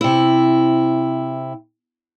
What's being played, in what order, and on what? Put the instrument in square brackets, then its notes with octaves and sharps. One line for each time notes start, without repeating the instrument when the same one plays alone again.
[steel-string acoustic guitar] C3 E4